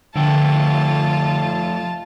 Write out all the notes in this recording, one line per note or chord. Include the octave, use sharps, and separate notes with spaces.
D3 F3 A3 F4 G5 A5